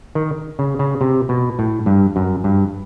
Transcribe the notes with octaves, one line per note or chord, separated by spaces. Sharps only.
D#3
C#3
C#3
C3
B2
A2
G2
F#2
G2